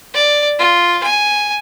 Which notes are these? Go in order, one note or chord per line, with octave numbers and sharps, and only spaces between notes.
D5
F4
G#5